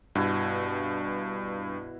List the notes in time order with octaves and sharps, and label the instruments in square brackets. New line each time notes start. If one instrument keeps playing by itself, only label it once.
[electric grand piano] G2 [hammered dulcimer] B2 E4